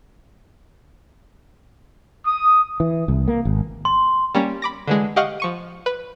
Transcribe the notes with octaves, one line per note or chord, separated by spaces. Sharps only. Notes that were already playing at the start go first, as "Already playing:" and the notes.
D#6
E3
C2
A#3
G#1
C6
G3 A#3 C#4
B5 D6 A#6
D3 E3 G#3
G4 D#5 F5 F#5 C#6 F6
F3 C#6 D#7
B4